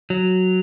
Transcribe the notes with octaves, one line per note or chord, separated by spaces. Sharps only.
F#3